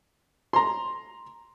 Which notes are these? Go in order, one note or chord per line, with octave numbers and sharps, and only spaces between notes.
A#5 C6